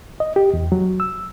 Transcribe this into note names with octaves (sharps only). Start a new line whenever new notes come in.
D#5
G4
E2
F#3
E6